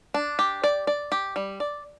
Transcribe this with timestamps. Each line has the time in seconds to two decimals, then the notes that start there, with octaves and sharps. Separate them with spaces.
0.14 D4
0.39 G4
0.64 D5
0.87 D5
1.12 G4
1.36 G3
1.60 D5